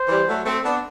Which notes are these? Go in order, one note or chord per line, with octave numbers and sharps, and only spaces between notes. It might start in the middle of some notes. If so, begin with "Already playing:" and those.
Already playing: C5
E3 G3
F#3 A3
A3 C4
B3 D4